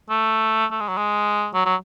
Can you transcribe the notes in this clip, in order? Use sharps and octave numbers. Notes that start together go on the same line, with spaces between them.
A3
A3
G#3
F#3
G#3
F#3
F#3